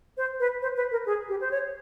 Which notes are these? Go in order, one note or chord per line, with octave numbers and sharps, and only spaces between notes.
C5
B4
C5
B4
A#4
G#4
G4
C5
C#5